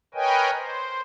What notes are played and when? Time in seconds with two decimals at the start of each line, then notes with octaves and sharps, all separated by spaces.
0.14 A#4 B4 C#5 D#5 G5 G#5
0.56 C5